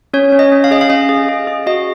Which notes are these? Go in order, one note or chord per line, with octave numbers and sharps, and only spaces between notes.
C#4 C#5
C#4
D#5
C#4
F5
G#4 D#5
F5
C#4 D#5
G#4
G#4
G#4
F#4 D#5